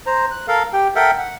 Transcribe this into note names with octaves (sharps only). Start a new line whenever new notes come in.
C5 A#5
F#6
A4 A#4 F5
G4 G5
A4 A#4 E5 F#5 G5
F#5